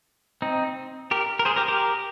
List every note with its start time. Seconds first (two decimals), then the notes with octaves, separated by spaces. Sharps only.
0.42 C4 D#4
1.11 G4 A#4
1.39 A#4
1.45 G#4 C5
1.56 G4 A#4
1.68 G4 A#4